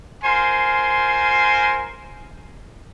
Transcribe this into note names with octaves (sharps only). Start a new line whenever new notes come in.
F4 A#4 C5 G#5 C6